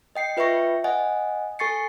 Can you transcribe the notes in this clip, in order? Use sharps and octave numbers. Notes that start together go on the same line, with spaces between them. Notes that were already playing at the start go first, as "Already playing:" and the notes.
D#5 G5 C7 C#7
F4 B4 E5 G5 C#6 A#6
D#5 F#5 G#5
A4 G#5 C#6 A6 C7 C#7